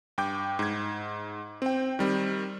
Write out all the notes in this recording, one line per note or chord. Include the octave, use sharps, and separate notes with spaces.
G2 G5 D6 G6
G#2 G#6
C4 G5
D#3 G3 C4